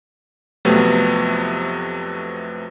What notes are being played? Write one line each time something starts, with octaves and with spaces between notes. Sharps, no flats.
F2 C3 F#3 A3 B3